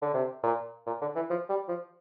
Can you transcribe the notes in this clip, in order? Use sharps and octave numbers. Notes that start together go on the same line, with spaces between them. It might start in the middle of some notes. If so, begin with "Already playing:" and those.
D3
C3
A#2
A#2
D3
E3
F3
G3
F3